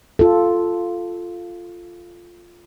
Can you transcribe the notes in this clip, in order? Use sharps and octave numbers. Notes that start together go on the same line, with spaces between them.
F4 A4